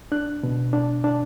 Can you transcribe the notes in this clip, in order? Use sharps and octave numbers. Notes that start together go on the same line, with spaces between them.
D4 F#6
B2
D4
D4